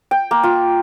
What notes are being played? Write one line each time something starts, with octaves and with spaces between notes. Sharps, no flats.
G5
A#3
F4